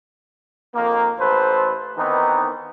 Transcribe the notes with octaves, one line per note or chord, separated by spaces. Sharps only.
F2 D#3 A#3
A1 A4 B4 C5
D#3 E3 B3 C4 D#4